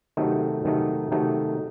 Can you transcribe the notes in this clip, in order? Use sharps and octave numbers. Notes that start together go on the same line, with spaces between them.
C3 D#3 F#3 A3 D#4
C3 D#3 F#3 A3 D#4
C3 D#3 F#3 A3 D#4